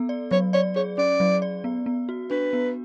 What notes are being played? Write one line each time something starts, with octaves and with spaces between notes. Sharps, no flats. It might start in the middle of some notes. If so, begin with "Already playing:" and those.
Already playing: B3 A4
D5
F#3 C#5
C#5 D5
G#4 C#5
C#4 D5
F#3
D5
B3
B3
F#4
D4 B4
B3